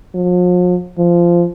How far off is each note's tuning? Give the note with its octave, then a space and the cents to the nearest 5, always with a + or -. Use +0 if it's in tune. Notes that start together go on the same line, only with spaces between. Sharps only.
F3 +45
F3 -15